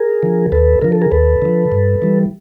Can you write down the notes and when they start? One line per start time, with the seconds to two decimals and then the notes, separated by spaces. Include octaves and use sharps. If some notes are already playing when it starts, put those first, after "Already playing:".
Already playing: G#4 A#4
0.23 D3 F3
0.52 D#2 A4 B4
0.82 D3 F3 A#4
0.92 A4
1.02 G#4 A#4
1.12 D#2 A4 B4
1.42 D3 F3
1.72 G2
2.02 E3 G3